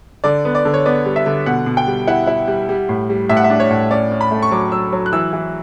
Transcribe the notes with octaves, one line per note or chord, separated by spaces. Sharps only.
D3 D5
B3
D5
D3
C#5
B3 D5
G3
E5
D3
B2 F#5
B2
G5
G3
E4 F#5
E4
G3
G3
A2
G3
A2 E5
F#5
E5
D4
C#5
A2
C#4 D5
C#4
B5
A3
C#6
F#3 D6
F#3 E6
F#3
F#6
E3 E6
E3